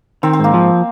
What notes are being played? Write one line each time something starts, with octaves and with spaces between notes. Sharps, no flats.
D#3 C4
C4
G#2 A#3
F3